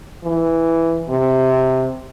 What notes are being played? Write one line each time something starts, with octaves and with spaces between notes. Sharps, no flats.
E3
C3